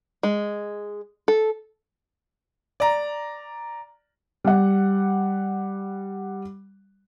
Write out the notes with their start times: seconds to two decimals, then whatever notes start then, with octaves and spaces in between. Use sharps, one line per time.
0.23 G#3
1.28 A4
2.80 D5 A#5
4.44 G3 F#5